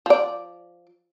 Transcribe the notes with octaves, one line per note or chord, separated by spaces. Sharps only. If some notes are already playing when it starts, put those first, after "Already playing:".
F3 D5